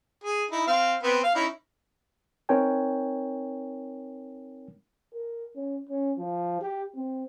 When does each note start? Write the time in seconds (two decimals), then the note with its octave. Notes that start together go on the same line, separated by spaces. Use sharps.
0.24 G#4
0.51 D#4 E4
0.67 C4 F5
1.03 B3 C4
1.24 F5
1.35 C#4 D#4 E4
2.49 C4 D#4 A#4 C#5 G5 G#5
5.14 A#4
5.56 C#4
5.89 C#4
6.18 F3
6.62 G4
6.96 C4